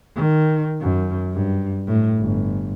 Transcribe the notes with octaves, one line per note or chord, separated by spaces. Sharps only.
D#3
F#2
G2
A2
G1